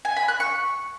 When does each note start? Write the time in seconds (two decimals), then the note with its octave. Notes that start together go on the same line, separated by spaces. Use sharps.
0.05 G#5
0.17 B5
0.28 F#6
0.40 C#6